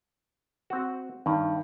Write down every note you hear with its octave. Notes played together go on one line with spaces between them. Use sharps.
C4 F#4
G2 D#3